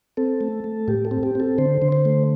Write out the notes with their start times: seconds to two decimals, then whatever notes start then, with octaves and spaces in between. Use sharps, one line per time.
0.17 C4 A4
0.41 A3
0.64 A3
0.88 A2 G4
1.05 A4
1.11 C4
1.23 G4
1.35 C4 A4
1.58 D3 C5
1.82 D3
1.92 C5
2.05 A3